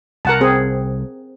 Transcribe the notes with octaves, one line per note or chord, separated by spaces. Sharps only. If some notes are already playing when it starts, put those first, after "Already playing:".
C2 C3 A#4 F#5 A5
C4 G#4